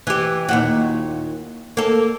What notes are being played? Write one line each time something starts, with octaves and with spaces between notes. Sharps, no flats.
E3 G4
D#2 A#2 F#4
A#3 A4